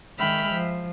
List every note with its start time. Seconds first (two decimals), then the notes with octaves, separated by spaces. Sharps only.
0.18 D#3 G#3 E5 G5 B5 F6
0.52 F3